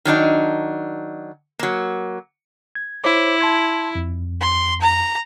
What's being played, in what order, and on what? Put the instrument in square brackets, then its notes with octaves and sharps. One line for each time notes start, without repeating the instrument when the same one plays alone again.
[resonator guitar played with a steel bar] D#3 F#3 D4 D#4
F#3 A#3
[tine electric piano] G#6
[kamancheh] E4 [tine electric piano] C5 C#5 D6
[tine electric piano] A5 C6 G#6
F2
[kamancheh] C6
A#5